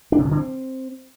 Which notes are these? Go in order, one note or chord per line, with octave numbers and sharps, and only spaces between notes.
D4
C3
C#3
D3
C4